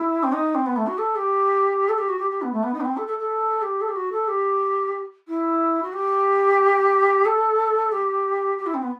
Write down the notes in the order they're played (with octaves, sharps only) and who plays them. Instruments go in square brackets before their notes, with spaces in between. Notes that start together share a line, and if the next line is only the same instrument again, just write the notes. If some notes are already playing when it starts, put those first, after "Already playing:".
Already playing: [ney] E4
C4
D#4
C4
B3
A3
F#4
A4
G4
A4
G4
F#4
G4
G4
B3
A3
B3
D#4
B3
C4
A4
A4
A4
G4
A4
G4
F#4
A4
G4
E4
F#4
G4
A4
G4
G4
E4
C4
B3